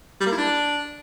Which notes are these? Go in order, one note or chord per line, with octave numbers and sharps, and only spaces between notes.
G3
A#3
E4
D4